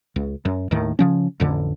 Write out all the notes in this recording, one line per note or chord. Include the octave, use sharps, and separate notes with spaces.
C#2
F#2
D#2 A2 D#3
C#3 F3 C#4
A1 F2 D3